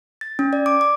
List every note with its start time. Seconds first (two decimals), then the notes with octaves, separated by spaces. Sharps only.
0.21 A6
0.39 C#4
0.53 D5
0.66 D6
0.81 D6